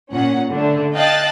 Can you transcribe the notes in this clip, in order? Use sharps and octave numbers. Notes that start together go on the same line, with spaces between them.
A#2 C#4 F#5
D3 A3 D4
D#5 F5 G5 A5 F#6 A6